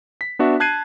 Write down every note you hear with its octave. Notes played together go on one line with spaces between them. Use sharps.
B6
B3 D4 F#4 E5
A5 F#6 G#6 C7 D#7